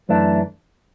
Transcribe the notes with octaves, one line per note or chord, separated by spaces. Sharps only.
F#2 E3 A3 D4